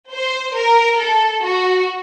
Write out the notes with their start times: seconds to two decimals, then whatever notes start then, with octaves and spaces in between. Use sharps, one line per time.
0.11 C5
0.55 A#4
0.98 A4
1.43 F#4